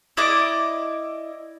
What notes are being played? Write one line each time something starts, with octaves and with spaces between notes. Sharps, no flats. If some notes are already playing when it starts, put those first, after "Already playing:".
E4 D5 D#5 D6